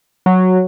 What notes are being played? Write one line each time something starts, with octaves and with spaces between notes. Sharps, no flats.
F#3